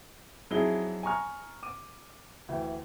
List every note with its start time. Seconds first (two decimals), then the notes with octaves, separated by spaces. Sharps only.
0.51 F2 F#3 D#4 E4 G#4 G7
1.03 G#5 A#5 C#6 F6
1.63 D6 D#7
2.49 D2 E3 G5